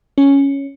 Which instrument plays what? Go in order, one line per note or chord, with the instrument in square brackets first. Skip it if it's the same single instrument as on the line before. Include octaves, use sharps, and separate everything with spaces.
[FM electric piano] C#4